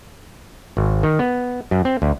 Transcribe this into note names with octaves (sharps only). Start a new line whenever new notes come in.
G#1
D#3
B3
F#2
C4
D2